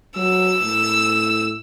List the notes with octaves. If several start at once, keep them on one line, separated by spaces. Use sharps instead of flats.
F#3 E6
A2